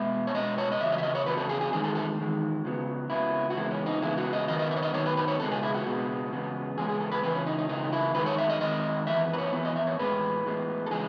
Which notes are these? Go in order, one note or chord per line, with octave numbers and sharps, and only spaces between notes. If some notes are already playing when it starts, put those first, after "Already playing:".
Already playing: B2 G#3 B3 E5
C#5
B2 G#3 B3 D#5
C#5
D#5
E2 C#3 F#3 E5
D#5
E5
D#5
C#5
E2 C#3 F#3 B4
A4
G#4
G#4
E2 D#3 G#3 G#4
A4
A4
E2 D#3 G#3
C#2 C#3 F#3 B3
C#2 C#3 F#3 B3 E4
F#4
E2 C#3 G#3 B3 E4
C#4
D#4
E2 C#3 G#3 B3 E4
F#4
D#5
F#2 D#3 F#3 B3 D#5
D#5
E5
C#5
D#5
F#2 D#3 F#3 B3 C#5
B4
B4
C#5
C#2 B2 G#3 B3 A4
G#4
E4
F#4
C#2 B2 G#3 B3
E2 C#3 G#3 B3
E2 C#3 G#3 B3 G#4
G#4
A4
B4
C#2 C#3 E3 B4
C#4
D#4
D#4
C#2 C#3 E3 D#4
E4
F#2 D#3 G#3 B4
C#5
E5
D#5
F#2 D#3 G#3 D#5
F#2 E3 B3 E5
B4
C#5
F#2 E3 B3 E4
D#5
E5
C#5
A2 E3 G#3 B3 B4
A2 E3 G#3 B3
A4
C#3 E3 G#3 G#4